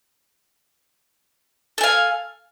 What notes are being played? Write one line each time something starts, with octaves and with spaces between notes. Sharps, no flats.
A4 F5 G#5